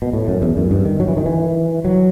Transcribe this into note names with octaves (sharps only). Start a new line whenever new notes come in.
B2
A2
F#2
E2
F#2
G2
D#3
F#3
E3
D#3
E3
F#3